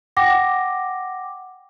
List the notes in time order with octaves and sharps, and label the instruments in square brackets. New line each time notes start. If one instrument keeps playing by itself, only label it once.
[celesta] F#5 G5 D6 A#6